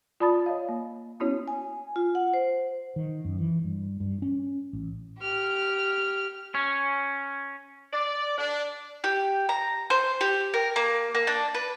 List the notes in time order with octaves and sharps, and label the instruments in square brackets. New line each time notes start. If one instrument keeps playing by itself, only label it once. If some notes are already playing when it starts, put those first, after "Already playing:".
[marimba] F4 D5 A5 B5 D#6 A6
C#5 D#5 F5
A#3
B3 C#4 E4 F#4 C#5
[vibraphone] G#5
F4
F#5
C5
[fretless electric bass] D#3
F#2
E3
G2
G2
C#4
A1
[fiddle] G4 F6
[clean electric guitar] C#4
[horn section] D5
D4
[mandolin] G4
A#5
C5
G4
A#4
A#3
A#3
D4
B4